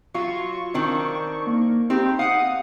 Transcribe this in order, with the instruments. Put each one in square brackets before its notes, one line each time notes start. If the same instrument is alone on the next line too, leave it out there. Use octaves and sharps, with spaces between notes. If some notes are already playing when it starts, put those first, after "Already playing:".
[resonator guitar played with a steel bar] F#3 F4 [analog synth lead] C#6
[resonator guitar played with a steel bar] D#3 C4 D4
[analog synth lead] A#3
[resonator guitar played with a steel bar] C4 G4 [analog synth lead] D#4
[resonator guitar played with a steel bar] F5 F#5 [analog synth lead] D#6